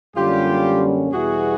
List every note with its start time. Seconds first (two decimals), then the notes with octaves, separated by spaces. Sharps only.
0.16 F#2 D3 G3 A#3 C#4 F4 G4
1.12 E2 B2 G3 B3 E4 F#4 G#4